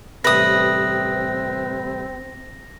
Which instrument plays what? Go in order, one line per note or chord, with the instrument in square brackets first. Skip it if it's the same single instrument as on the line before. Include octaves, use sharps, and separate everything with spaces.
[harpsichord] A1 G2 C3 [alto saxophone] C4 [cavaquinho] B4 D#6 [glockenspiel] A#6